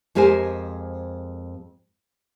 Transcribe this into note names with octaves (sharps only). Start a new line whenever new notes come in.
F2 G#3 G4 A#4 C5 G#5